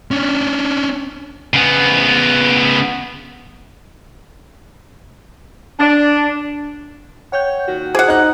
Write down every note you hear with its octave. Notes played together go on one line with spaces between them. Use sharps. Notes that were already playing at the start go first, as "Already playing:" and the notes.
C#4 D4
C#3 B3
D4
C#5 F#5 G5 G6
A#2 D#3 F#4
G#4 C5 F#5 D6 D#6
D#4 F#6